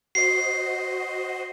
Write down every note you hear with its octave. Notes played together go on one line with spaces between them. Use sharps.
F#4 C5 D#5 C7